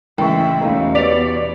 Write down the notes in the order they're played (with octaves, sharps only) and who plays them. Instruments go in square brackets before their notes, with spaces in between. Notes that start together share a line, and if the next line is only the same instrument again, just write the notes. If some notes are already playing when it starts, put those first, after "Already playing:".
[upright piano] A1 C#3 [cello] G#3 E5 [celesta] G5 C#6
[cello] E2 B2 [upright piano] A3 C#4 D#4 [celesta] F5 A#5
[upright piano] B3 G4 C#5 [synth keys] D5 [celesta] B6 F7